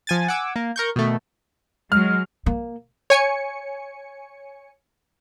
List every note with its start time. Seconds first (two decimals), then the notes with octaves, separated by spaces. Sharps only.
0.07 F3 G#5 A6
0.28 F#5 G#5 D6 E6
0.56 A#3
0.76 A#4 C#6 G6
0.96 B2 D#3 A3
1.92 F#3 G#3 F6
2.46 A#3
3.10 C#5 G#5 C#7